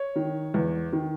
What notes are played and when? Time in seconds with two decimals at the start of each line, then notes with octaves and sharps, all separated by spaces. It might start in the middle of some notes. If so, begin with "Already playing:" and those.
Already playing: C#5
0.16 D#3
0.54 E2
0.92 D#3